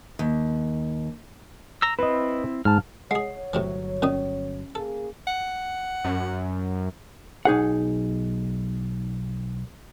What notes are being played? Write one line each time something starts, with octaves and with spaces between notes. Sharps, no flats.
D#2
A#5 E6
C4 E4 B4 D#5
G#2 A5 F6
G#3 G#4 C#5 F#5
G1 A2 C3 E3 F#3
A#2 D#3 C#4 D#6
A#3 G#4 A4
F#5
F#2
B1 D#4 G#4 F#5